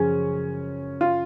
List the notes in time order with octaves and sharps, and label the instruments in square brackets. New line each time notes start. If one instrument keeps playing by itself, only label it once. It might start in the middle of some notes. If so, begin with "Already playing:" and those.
Already playing: [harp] F#2 C#3 F3 G#3 [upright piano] C#4
[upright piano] F4